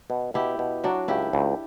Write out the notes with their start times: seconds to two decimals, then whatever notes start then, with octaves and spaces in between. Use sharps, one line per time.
0.10 B2
0.34 B2 E4 G4
0.59 B2
0.84 F#3 D4 F#4
1.08 C#2 E4 G4
1.33 C#2